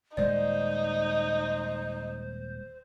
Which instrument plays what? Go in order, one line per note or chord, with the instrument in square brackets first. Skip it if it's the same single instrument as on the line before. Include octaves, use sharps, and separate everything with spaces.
[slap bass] D#1 G#3 [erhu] D#4 [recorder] C5 [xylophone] D5